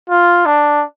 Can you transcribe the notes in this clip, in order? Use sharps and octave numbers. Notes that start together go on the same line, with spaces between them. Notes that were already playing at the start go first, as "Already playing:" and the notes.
F4
D4